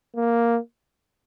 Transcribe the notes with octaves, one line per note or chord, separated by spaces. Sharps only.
A#3